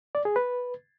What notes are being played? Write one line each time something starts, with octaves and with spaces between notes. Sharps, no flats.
D5
G#4
B4